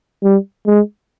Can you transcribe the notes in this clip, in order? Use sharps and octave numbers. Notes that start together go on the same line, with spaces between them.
G3
G#3